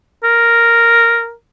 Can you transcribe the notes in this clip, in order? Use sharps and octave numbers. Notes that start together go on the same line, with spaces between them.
A#4